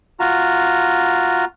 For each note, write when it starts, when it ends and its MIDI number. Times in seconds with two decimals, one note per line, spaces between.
0.20 1.45 65
0.20 1.45 66
0.20 1.45 82